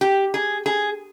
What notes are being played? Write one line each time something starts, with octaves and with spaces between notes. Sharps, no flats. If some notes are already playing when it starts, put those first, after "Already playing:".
G4
G#4
G#4